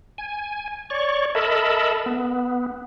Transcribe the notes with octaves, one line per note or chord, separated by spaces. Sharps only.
G#5
C#5 D5 C#6
A4 A#4 D#5 E5 A5 B5
B3